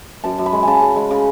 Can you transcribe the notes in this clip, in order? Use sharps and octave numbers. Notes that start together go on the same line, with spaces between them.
F#2 A5
F#2
B5
G#3
C#3 G#5 A5
C#3
G#3
C#3